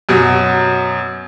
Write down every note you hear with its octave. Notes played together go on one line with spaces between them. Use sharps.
F#2 B2 F#3